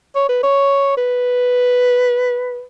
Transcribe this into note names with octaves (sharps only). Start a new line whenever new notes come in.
C#5
B4
C#5
B4